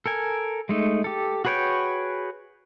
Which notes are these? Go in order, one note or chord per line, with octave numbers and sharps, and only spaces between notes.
A4 A#4 G#5
G#3 A3 D#4
G4 A4
F#4 G#4 B4 C#5 G5